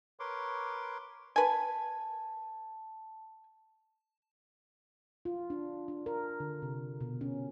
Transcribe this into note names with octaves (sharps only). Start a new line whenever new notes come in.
A#4 B4 C#5 C6 D6
B4 G#5 A5
F4
D4
D4
A#4
D3
C3
B2
C#4